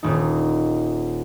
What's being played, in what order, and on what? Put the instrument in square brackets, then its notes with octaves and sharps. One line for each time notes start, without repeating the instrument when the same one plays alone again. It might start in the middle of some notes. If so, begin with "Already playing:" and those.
[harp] D#1 D#4